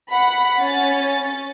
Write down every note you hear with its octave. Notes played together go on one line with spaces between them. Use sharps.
F#5 B5
C#4 A6